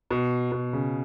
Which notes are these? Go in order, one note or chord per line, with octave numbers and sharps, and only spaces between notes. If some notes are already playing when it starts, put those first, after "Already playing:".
B2
B2
C#3